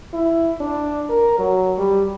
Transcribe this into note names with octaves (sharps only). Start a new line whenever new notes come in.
E4
D4
A#4
F#3
G3